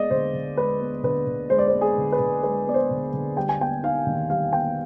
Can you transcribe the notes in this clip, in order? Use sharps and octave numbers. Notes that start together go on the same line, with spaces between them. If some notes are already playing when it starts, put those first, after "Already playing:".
Already playing: G#3 B3 D5 D#5
D3 C5
D3
G#3 B4
B3
D3 B4
D3
G#3 C5
D5
C5
B3
G#4
D3
B4
D3
G#3 B4
B3 D5
C5
D3
D3
G3 G5
G#5
B3 G5
D#4 F5
D#3
G3 F5
B3 G5